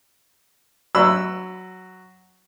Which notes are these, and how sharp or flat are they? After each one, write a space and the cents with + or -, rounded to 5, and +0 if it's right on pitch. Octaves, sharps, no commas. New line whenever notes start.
F#3 +0 B5 +20 E6 +10